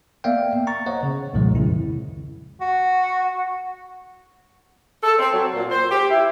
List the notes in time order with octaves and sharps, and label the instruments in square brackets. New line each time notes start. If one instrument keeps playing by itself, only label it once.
[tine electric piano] A#3 B3 D5 E5 F5 G5
A#5 C#6 A6
C5 C#5 D#5 F#5
C#3
C2 F2 A#2 D#3 F3 G#3
F2 C#3 E4
[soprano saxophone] F#4
[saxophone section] A4
C4
F#3
A#2
C5
G4
E4